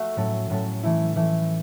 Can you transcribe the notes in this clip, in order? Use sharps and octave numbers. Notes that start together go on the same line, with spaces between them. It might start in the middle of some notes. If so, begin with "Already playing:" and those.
Already playing: A3 F#4 E5
A2 F#3 C#4 A4
A2 F#3 C#4 A4
E3 A3 E4
E3 A3 E4